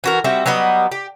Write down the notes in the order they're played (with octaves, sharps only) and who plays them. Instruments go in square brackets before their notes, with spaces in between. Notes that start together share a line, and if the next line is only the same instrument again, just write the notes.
[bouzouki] E3 F#4 A#4
G3 C4 F#4 E5
F#3 G3 B3 D#5
G4